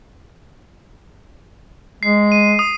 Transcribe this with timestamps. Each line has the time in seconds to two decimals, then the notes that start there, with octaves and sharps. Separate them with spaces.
2.03 G#3 C7
2.32 D#7
2.59 D#6